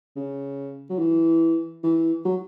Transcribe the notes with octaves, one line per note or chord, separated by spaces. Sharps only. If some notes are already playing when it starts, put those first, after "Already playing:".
C#3
F#3
E3
E3
F#3